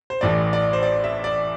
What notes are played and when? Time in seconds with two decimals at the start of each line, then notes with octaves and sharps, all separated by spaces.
0.10 C5
0.21 A1 A2 E3 D5
0.53 D5
0.73 C5
0.83 D5
1.04 E5
1.24 D5